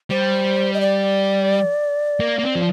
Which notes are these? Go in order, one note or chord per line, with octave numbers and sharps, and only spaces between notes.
G3 C5
D#5
D5
A#3
A#3
C4
F3